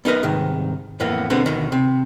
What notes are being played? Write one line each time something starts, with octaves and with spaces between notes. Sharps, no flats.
B3 D#4 A#4 B4 D#5
C2 G#2 D#3
F2 A2 E3 A#3 B3
E2 B2 D3 B3 C4
D2 B2 D#3
C3